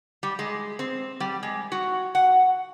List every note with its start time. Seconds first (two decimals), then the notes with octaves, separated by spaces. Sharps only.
0.23 G3
0.39 G#3
0.79 C4
1.20 G3
1.43 G#3
1.72 F#4
2.15 F#5